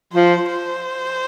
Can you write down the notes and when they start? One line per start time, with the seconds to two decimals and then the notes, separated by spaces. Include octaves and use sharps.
0.13 F3 C5
0.49 C5